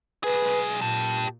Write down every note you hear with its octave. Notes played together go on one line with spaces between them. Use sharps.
B1 G#4 B4
A#2 G4 A5